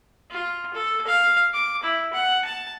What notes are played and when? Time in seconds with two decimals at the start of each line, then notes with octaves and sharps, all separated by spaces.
0.31 F4
0.74 A4
1.07 F5
1.54 D6
1.83 E4
2.13 F#5
2.45 A5